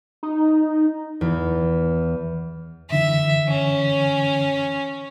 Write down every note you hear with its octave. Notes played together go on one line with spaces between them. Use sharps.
D#4
E2
F#2 D3 E3 E5
C#4